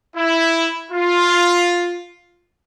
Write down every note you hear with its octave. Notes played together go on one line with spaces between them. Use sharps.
E4
F4